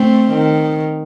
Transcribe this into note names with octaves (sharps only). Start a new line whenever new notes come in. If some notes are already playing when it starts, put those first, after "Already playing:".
Already playing: A3 C4
D#3